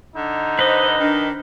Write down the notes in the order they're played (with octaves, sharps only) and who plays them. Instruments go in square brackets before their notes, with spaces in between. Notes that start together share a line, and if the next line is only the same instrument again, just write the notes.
[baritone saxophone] D3 [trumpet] D#4
[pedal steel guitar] B4 D#5 [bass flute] C5
[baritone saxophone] D#3 [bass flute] D4